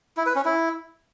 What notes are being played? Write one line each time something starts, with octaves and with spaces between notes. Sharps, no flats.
E4
B4
C#4
E4